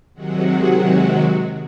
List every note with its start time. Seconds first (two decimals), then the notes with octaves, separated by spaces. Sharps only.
0.14 C3 D#3 F#3 G#3 F#4